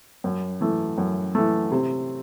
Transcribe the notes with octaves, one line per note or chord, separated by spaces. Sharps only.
F#2
E3 A3
F#2
E3 A3
C3